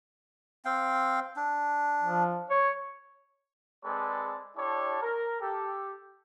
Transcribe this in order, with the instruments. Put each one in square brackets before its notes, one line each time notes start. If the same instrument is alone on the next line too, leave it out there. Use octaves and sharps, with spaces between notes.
[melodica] C4 F5 G5
D4
[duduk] F3
C#5
[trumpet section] G#3 C4 G#4 A4 B4 D5
D4 E4 G4 A4 C#5 D5
A#4
G4 A4